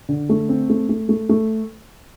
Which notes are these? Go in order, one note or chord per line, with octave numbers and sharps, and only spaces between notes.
D3
A3
C4
A3
A3
A3
A3